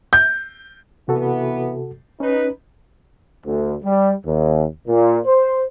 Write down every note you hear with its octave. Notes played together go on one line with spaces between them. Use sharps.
G6
C3 E3 B3 F#4 A4
C#4 D#4 B4
D2
G3
D#2
A#2
C5